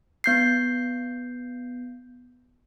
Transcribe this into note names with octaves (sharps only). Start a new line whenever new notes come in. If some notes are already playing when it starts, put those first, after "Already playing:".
B3 G6 C7